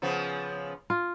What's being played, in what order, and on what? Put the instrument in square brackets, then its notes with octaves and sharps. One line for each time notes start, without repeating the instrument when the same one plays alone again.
[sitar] C#3 F3 B3
[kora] F4